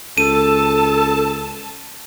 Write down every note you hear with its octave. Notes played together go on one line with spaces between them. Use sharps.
C#2 A4 A5 D#7